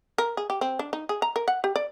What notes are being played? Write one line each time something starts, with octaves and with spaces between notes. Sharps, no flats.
A#4
G#4
G4
C4
D4
D#4
G#4
A#5
A#4
F#5
G4
D5